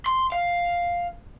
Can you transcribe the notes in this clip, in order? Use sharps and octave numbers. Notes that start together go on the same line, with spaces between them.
C6
F5